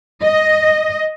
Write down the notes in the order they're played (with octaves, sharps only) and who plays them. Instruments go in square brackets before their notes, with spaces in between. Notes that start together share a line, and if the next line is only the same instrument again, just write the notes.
[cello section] D#5